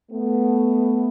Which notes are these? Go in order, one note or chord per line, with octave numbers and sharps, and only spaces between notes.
A3 B3